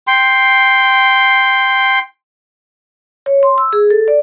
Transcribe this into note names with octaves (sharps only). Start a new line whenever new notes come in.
G5 C6
C#5
C6
E6
G#4
A4
D5